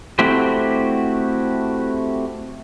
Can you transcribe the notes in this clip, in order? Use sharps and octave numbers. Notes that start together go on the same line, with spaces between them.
A3 C4 E4 F#4 G4 C5